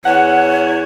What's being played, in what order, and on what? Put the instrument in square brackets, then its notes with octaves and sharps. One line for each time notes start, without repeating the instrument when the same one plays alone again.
[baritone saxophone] E2 [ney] C#5 [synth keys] F#5